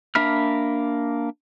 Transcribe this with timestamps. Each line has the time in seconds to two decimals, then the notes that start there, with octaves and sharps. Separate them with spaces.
0.15 A#3 D4 E5 B5 F6